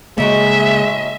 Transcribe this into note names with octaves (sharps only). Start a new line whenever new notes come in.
A2 C#3 G#3 A#3 D#4 F#4 E5